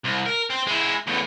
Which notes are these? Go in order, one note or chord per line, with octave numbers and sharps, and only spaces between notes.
C2
A#4
C4
G#3 E4
E2 A2